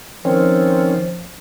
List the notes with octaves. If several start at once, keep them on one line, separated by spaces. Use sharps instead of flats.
D#3 F3 C4 C#4